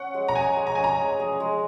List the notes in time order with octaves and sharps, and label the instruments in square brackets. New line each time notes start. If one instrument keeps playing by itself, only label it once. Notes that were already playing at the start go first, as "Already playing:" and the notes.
Already playing: [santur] C#4 [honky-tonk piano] F#5
[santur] G#3
[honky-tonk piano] A#5
[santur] G#4 [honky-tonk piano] G#5
[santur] G#3
[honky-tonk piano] A#5
[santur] C#4 [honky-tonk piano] G#5
[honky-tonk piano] A#5
[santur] G#3
G#4
G#3